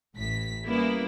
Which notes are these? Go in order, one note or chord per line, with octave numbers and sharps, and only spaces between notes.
A1 A2 B6
G3 A#3 B3 C#4 E4